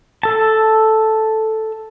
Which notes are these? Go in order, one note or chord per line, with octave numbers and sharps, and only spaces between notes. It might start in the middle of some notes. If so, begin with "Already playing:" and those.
A4 A5